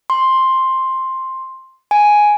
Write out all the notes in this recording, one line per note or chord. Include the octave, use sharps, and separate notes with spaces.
C6
G#5